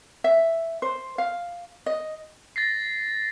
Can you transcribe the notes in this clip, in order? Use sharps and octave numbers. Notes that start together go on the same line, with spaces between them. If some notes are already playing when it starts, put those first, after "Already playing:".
E5
C5
F5
D#5
A6 A#6 C7